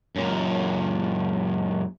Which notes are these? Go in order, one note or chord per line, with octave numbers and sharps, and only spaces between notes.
F#2 A#2